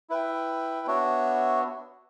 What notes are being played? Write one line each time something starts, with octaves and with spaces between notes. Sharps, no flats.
E4 B4 E5 G5
B3 D4 F#4 C#5 E5